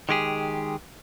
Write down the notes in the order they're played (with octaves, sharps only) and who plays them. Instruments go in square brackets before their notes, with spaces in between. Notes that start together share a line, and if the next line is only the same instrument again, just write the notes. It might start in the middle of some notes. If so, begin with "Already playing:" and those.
[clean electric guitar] D#3 G#3 G4 G#4